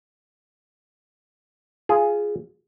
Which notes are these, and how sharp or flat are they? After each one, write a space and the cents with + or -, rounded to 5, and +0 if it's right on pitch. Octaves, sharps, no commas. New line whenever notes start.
F4 -15 G#4 +0